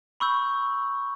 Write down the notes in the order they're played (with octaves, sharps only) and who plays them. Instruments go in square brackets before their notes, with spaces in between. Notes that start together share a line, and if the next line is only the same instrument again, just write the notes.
[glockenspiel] B5 C#6 E6 G6